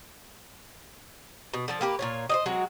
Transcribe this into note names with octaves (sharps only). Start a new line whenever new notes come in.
B2
D3 F3 A4
A#3 G4 B4
A#2 F4 C#5
C5 D5 D#5
F#3 G#3 C4 F#4